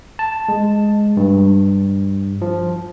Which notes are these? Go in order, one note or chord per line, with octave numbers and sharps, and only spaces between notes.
A5
G#3
G2
F3